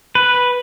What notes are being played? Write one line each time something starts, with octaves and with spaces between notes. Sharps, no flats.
B4